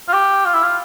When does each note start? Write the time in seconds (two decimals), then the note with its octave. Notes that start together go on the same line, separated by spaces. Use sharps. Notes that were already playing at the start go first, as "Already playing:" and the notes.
0.08 F4
0.13 G4
0.45 F4
0.54 E4
0.63 F4